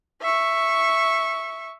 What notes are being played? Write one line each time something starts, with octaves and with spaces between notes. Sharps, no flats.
E5 C#6